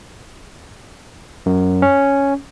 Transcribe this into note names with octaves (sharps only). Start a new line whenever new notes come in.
F#2
C#4